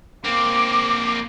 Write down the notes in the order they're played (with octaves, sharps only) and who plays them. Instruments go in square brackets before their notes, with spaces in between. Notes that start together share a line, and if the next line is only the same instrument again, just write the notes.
[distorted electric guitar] A#3 C4 [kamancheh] D6